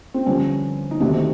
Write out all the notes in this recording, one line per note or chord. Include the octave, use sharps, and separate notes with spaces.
C4
G2 D3 F3 C#4
D#4
D2 C3 D#3 D4